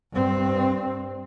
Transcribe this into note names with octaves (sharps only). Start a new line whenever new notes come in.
G2 C4